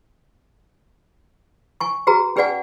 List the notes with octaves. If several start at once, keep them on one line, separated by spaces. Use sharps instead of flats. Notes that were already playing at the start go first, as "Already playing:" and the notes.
G#5 C#6
F#4 G#4 B4 A#5
C#4 G#4 B4 D5 F#5 G#5